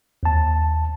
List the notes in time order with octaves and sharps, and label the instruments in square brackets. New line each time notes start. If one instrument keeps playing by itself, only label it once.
[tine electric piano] D#2 A5